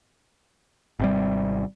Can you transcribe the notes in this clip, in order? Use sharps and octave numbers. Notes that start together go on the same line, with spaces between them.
G#1 C3 G3